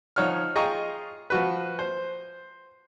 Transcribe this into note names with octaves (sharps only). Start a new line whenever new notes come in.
F3 D#4 C#5 F#5 F6
F4 G#4 D#5 G5 A#5 C#6
F3 F#4 B4
C5